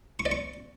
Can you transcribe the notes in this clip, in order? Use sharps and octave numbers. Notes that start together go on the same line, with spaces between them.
C#6
D5
C#6